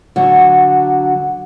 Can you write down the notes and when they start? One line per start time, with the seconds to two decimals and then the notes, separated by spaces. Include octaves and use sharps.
0.16 D3 F#3